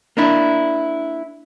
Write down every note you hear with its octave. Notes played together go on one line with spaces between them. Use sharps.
A#3 D4 E4